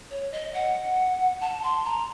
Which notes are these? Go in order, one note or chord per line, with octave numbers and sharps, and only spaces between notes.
C#5
D#5
F#5
A5
C6
A#5